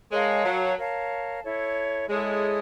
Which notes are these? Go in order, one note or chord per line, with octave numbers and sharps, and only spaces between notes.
G#3 A#4 C#5 F5 A5
F#3
A#4 C#5 F5 A5
E4 A4 C#5
G#3 E4 A4 C#5